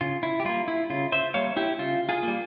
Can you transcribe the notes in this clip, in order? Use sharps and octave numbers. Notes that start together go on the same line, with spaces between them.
C#3 F4
E4
G4
G3 A#3 F4
E4
C#3 F4
C5 E5
G3 A#3 C#5 F5
E4 G4
C#3 F4
F4 G#4
G3 A#3